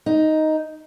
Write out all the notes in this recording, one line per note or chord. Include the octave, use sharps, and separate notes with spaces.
D#4